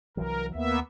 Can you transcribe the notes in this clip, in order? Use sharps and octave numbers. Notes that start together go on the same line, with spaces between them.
C2 E3 F#3 A#4
D#2 A#3 B3 E5